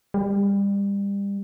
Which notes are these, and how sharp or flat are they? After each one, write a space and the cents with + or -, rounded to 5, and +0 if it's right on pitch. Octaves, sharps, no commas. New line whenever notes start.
G3 +30